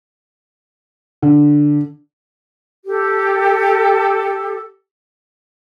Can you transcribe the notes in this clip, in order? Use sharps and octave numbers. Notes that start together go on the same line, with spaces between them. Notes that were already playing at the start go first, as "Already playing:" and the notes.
D3
G4 A4